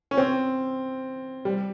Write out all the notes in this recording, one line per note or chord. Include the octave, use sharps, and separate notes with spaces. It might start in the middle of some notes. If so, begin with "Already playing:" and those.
C#4
C4
G3